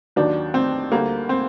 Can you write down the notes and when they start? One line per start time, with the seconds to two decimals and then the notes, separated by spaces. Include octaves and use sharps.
0.16 D#2 D#3 F#3 D4
0.54 C4
0.91 D2 D3 G3 A#3
1.29 C4